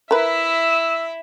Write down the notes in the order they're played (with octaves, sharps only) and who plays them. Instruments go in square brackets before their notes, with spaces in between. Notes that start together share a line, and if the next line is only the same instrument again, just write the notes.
[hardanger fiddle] E4 E5 [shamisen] A#4 B4 [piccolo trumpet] E6